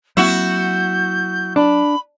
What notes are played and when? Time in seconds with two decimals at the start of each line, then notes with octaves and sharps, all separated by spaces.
0.17 F#3 A#3 C4 E4 F#4 G6
1.56 D4 B5